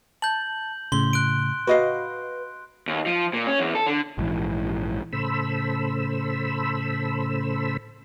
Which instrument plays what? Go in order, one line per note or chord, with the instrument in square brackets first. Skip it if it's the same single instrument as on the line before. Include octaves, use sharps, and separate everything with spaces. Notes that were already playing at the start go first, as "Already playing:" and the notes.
[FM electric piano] A5 [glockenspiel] G6 F#7
[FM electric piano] A2 C#3 [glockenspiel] C6 G7
[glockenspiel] F#6 D7
[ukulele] F#4 D#5 F5 [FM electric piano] B4
[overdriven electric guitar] D#2
F3
A#2
C#4
E2
A4
D3
[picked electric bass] A#1 G#2 E3
[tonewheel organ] A2 C#3 A4 C5 B5 E6